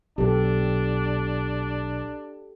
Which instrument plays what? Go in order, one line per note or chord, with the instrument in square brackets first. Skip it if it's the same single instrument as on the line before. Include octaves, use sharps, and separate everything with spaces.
[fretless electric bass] B1 [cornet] D4 [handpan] G4 A4